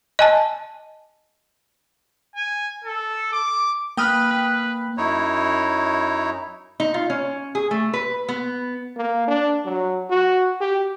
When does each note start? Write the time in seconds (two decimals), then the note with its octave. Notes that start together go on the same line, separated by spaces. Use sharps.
0.19 D#5 G#5 A5
2.35 G#5
2.84 A4
3.33 D6
3.97 A#3 B4 G5 D#6 F6
4.97 F#2 D#4 E4 C#5
6.80 D#4
6.94 F4
7.10 C#4
7.55 G#4
7.71 A3
7.94 B4
8.29 B3
8.97 A#3
9.28 D4
9.65 F#3
10.10 F#4
10.61 G4